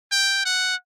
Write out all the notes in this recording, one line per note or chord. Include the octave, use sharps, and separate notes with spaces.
G5
F#5